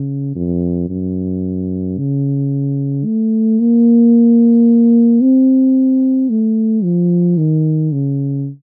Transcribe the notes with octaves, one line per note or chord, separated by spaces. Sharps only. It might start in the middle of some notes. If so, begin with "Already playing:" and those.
Already playing: C#3
F2
F#2
C#3
A3
A#3
C4
A3
F3
D#3
C#3